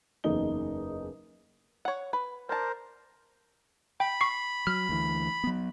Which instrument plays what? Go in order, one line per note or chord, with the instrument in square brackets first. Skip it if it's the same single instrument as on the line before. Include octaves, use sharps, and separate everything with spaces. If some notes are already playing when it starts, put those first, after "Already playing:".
[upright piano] F#1 E2 D#4 G7
[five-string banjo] C#5 F#5
B4
[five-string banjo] D4 A5 [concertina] A#4 C5
[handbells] G5 [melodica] B5
[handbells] C#6 C7
[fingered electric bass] F#3 [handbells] F6
[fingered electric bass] D2 E3
F#3 B3